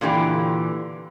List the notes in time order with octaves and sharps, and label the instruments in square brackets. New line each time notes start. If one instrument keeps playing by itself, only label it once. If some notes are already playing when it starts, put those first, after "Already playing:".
[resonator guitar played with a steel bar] A#2 D3 E3 G4